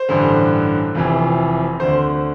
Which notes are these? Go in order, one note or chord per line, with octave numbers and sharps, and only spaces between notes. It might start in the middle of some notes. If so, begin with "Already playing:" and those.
Already playing: C5
A1 G2 D3
F1 F2 C3 E3
D2 D3 C5